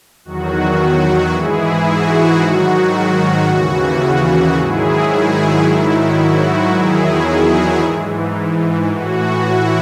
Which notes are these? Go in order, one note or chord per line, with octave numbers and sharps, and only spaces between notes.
E2 D#3 F#3 F#4
G#2 E3 E4 G#4
F#4
G#2 D#3 F#3 F#4
D#2 C#3 E3 F#4
G#2 D#3 F#3 E4 G#4
G#2 D#3 F#3 E4
F#4
E2 D#3 F#3 E4 G#4
G#2 E3
A2 E3 F#4
E4